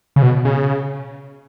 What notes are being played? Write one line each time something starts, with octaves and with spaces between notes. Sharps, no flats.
C#3
B2
C#3